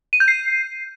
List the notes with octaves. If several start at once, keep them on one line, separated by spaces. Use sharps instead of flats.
D#7
G6
C7